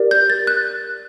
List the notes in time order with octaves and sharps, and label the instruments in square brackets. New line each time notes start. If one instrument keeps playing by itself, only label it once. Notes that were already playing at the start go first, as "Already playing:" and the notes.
Already playing: [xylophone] G4 A#4 D5
G6
A6
F#6